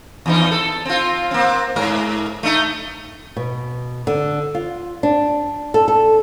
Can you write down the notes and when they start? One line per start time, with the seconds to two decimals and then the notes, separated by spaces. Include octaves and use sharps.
0.26 E2 E3 D#4
0.51 A4
0.85 C4 F4
1.31 A#3 C4
1.76 G#2 A#4
2.43 A3 D#4
3.36 B2
4.07 D3
4.55 F4
5.03 D4
5.74 A4
5.88 A4